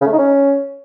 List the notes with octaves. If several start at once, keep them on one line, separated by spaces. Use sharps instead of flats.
C#3
A3
D#4
C#4